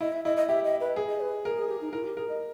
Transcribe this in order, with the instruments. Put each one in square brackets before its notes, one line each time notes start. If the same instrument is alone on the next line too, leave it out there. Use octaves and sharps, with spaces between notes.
[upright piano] E4 [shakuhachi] D#5
[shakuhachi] E5
[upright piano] E4 [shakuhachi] D#5
[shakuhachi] D#5
[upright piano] G4 [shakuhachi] E5
[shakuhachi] D#5
B4
[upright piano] G#4
[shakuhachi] D#5
B4
[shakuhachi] G#4 [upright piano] A#4
[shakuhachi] G#4
G4
D#4
[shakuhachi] E4 [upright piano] A#4
[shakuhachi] G4
[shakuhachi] G#4 [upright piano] A#4
[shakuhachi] D#5